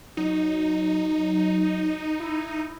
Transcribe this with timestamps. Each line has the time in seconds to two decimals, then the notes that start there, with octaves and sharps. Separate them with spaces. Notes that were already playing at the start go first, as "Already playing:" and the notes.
0.17 F#3 D#4
2.20 E4